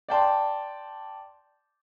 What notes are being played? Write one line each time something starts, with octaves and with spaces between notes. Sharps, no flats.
D5 G5 A5 C6